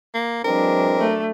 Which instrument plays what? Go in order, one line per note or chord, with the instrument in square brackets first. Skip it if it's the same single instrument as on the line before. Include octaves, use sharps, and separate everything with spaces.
[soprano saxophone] A#3
[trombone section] E3 G#3 C4 [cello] F#3 D4 [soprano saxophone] A#4
[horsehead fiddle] A3